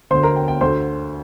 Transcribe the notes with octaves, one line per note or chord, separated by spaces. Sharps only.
D2 D3 C5 C6
A#4 A#5
G5
G5
D2 D3 C5 C6